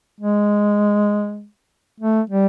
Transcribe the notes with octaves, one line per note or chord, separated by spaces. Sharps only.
G#3
A3
G3